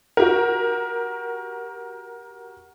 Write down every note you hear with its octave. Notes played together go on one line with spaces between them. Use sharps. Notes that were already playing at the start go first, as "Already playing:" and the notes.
F#4 G4 A#4